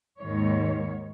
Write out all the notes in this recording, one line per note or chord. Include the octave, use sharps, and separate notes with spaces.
D#2 G#2 D#3 C#5